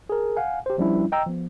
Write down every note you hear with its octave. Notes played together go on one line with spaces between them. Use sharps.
G#4 A#4
F5 F#5 G#5
G4 C5
F3 G3 C#4 D4 E4
D#5 G5 A#5 E6
F3 B3